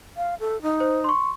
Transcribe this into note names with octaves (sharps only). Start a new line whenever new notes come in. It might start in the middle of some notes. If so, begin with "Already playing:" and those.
F5
A4
D#4
C5
C6 C#6